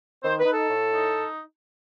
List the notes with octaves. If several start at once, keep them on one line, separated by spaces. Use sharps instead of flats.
D#3 C5
B4
D#4
A4
A2
D#4